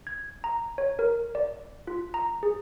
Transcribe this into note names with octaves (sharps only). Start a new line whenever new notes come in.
G#6
A#5
C#5
A#4
D5
F4
A#5
G#4